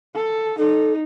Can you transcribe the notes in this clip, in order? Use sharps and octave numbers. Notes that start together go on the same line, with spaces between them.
A4
D#4 A4